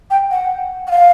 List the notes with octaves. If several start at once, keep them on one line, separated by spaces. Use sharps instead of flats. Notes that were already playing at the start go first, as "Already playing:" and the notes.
G5
F#5
F#5
F5